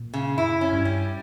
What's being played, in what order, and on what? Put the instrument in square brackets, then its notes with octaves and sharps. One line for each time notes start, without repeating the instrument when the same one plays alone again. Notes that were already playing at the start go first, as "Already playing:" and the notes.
Already playing: [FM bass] A#2
[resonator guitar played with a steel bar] C#3
[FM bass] F#2 [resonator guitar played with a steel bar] E4
[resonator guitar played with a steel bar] C#4
[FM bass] G2
[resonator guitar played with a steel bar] G3